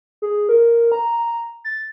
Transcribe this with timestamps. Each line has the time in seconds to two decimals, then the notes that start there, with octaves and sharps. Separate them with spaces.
0.22 G#4
0.49 A#4
0.92 A#5
1.64 A6